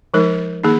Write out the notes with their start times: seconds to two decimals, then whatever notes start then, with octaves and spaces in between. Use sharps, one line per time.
0.14 F3 G#3 D#4 A#4
0.63 D#3 A#3 D#4 G#4